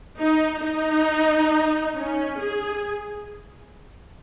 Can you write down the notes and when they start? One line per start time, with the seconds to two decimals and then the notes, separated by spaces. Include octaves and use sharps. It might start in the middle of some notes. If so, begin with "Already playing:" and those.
0.19 D#4
0.64 D#4
1.96 C#4
2.41 G#4